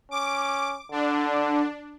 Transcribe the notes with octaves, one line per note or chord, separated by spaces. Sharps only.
C#4 D6
D3 D4